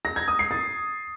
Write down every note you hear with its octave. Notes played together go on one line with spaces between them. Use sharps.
A#6
G#6
D#6
C7
A6